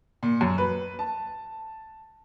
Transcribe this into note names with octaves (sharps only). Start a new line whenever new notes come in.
A#2
F#2
B4
A5